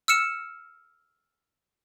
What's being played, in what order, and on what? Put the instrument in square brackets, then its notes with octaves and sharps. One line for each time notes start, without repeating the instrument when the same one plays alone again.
[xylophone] E6 F6 C#7 E7